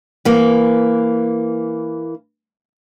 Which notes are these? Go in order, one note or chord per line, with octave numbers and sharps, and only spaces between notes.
E3 A#3